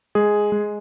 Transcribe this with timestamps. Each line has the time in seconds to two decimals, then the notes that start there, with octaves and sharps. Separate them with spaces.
0.15 G#3 G#4
0.52 G#3